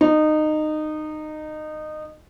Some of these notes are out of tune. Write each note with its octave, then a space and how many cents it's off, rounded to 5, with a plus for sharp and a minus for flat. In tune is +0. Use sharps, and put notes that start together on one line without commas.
D#4 -20